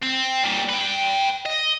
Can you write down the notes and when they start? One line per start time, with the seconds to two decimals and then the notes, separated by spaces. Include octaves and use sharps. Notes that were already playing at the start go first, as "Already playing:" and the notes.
0.03 C4
0.44 A#2 G3
0.69 B4 G5
1.46 D#5